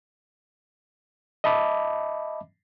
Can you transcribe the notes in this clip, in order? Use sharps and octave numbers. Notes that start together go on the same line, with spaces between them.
D#5 E5 A5 B5 D6